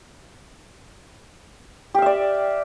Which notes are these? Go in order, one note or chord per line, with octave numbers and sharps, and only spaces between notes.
G4 D5 E5 F5